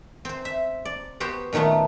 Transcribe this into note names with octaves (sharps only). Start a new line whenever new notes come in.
C4 C5
E5
D5
B3 F#4 G4 C5
A#2 D#3 F#3 A3 B3